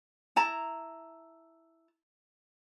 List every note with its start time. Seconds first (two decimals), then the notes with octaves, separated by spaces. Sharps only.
0.36 E4 A5 A#5